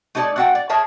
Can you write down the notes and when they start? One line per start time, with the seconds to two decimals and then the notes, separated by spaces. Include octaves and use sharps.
0.15 A3 D#4 A4 A#4 C#5 D5
0.36 A3 C4 F#4 E5 F#5 G5
0.55 D5
0.69 G#4 A#4 C#5 E5 A5